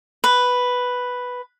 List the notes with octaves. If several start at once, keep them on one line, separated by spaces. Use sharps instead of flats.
B4